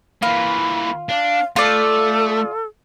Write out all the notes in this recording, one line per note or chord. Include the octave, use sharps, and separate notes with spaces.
E3 A#3 F4 B5
D4 F5
A3 F4 A4 D5